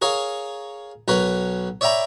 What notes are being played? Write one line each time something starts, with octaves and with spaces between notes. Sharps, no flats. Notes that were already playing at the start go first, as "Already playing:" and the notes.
G#4 A#4 C#5 F5
B1 A#4 B4 C#5 B5
C#5 D5 E5 G5 A#5 B5